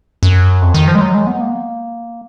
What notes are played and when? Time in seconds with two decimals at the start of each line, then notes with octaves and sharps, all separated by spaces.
0.23 F#2
0.62 F2
0.74 D#3
0.88 F3
0.95 G#3
1.01 F#3
1.14 G#3
1.27 B3
1.41 A#3